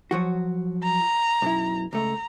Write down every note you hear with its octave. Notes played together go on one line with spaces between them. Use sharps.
F3 F#3 F#4
A#5
B1 F#2 E4
C#2 A3 A#5